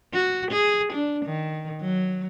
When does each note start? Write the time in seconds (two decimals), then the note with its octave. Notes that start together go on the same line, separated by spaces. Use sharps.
0.14 F#4
0.51 G#4
0.93 D4
1.25 D#3
1.81 F#3